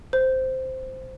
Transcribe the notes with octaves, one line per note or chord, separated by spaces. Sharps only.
C5